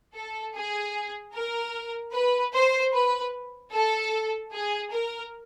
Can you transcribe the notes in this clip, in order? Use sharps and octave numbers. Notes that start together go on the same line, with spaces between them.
A4
G#4
A#4
B4
C5
B4
A4
G#4
A#4